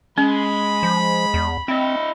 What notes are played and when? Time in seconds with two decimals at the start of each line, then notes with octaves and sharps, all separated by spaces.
0.18 G#3 C#4 B5
0.83 F3
1.34 E2
1.68 C4 E4 D#5